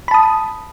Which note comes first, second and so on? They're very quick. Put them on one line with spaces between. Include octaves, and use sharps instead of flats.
B5 A5 D#6